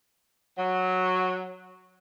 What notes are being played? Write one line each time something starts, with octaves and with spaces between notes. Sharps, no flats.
F#3